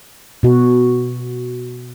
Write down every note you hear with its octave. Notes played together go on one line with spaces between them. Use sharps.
B2 F#4